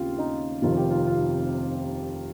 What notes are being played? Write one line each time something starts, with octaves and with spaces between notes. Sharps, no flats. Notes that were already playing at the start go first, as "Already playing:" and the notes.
Already playing: D#2 C#3 C4 F4 G4
D#4
F1 F2 C3 D#3 F4
G4
F4
F4